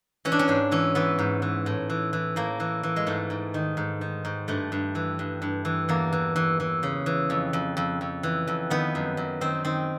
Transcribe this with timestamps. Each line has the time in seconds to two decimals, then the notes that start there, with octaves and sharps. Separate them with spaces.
0.25 E3 C#4
0.32 D4
0.39 C#4
0.48 G#2 D4
0.72 E3 C#4
0.95 E3 B3
1.19 G#2
1.42 E3
1.66 A2
1.90 E3
2.13 E3
2.36 A2 A#3
2.60 E3
2.83 E3
2.96 G#3
3.07 G#2 A3
3.30 G#2
3.54 D#3
3.77 G#2
4.01 D#3
4.25 G#2
4.48 G2 A3
4.72 G2
4.95 E3
5.19 G2
5.42 G2
5.65 E3
5.89 E2 A#3
6.13 E3
6.36 E3
6.60 E3
6.83 C#3
7.06 E3
7.30 F2
7.53 F2
7.77 F2
8.01 F2
8.23 E3
8.47 F2
8.70 D#3 B3
8.95 F#2
9.17 F#2
9.41 D#3 C4
9.65 D#3 C4